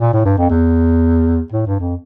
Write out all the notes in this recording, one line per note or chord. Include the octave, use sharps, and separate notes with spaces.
A#2
A2
G2
F2
E2
A2
G2
F2